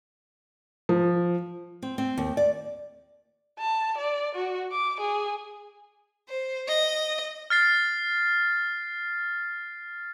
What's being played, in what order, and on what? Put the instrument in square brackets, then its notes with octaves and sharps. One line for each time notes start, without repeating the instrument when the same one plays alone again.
[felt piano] F3
[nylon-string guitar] C4
C4
D#2
D5
[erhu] A5
D5
F#4
D6
G#4
[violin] C5
D#5
[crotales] F6 A6 C7